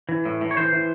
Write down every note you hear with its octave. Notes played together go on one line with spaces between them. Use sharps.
E3
A2
A2
C#5
E3 C5
E3